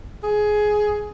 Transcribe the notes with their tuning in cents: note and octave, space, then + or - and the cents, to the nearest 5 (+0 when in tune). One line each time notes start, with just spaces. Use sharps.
G#4 +15